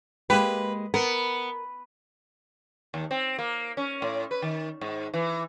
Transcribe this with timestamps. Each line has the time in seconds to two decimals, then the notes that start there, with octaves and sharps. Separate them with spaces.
0.30 G#3 A#3 G4 B4
0.94 B3 A#4
2.94 D#2
3.11 C4
3.39 A#3
3.77 C#4
4.02 A2
4.31 B4
4.42 D#3
4.81 G#2
5.14 E3